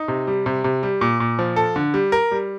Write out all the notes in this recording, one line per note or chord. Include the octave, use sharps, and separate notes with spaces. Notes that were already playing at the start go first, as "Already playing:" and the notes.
Already playing: D#4
C3
G3
C3
C3
G3
A#2
A#2
F3
A4
D3
G3
A#4
G3